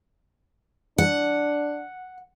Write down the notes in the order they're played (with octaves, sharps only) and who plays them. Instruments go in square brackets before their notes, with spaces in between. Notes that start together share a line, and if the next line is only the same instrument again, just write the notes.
[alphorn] D4 [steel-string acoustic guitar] F#5